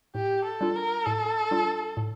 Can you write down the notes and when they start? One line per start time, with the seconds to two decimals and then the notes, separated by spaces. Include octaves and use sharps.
0.15 A2 G4
0.46 A4
0.61 G3 D4 F4
0.76 A#4
1.06 A2 A4
1.51 G3 D4 F4
1.97 A2